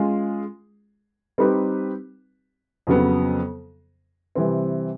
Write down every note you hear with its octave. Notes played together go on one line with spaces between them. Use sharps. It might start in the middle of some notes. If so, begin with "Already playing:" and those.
Already playing: G#3 C#4 F4 G#4
G3 C4 D#4 G4 B4
F2 C#3 F#3 B3
C3 E3 G3 C4